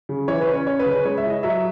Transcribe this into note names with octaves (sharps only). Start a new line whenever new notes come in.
C#3
E3 C#5
B4
C#4
C#5
C#4 C#5
B4
C#3
B4
G#3 C#5
E5
E4
D#5
F#3 E5